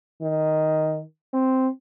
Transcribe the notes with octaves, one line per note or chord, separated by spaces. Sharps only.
D#3
C4